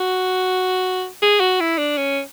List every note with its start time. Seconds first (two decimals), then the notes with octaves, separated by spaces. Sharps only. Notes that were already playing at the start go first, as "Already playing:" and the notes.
Already playing: F#4
1.22 G#4
1.40 F#4
1.60 E4
1.78 D4
1.98 C#4